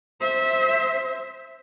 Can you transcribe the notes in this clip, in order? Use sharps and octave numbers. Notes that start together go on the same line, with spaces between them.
C5 E5